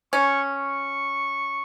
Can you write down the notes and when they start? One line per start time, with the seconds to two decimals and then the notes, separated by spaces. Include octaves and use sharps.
0.13 C#4 C#6
0.54 C#6